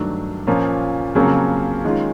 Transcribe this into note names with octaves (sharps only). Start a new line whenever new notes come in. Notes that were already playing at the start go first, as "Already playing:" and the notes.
Already playing: G2 D#3 F#3 A3 D4
A#2 F3 A#3 C#4
F2 C#3 F#3 A#3 C#4
D#3 G#3 C#4 F4